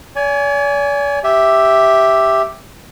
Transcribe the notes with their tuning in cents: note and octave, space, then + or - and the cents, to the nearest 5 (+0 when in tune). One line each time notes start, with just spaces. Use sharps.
D5 -45 G#5 +0
G4 +0 E5 +0